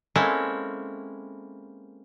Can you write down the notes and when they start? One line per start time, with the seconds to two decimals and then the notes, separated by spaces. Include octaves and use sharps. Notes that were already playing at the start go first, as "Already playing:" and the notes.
0.16 G#3 A#3 C4 C#4 E4 A4